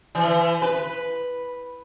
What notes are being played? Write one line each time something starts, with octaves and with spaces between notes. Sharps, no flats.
E3
B4